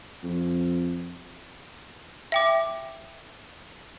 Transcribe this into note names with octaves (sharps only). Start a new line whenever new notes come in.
F2
E5 G5 D6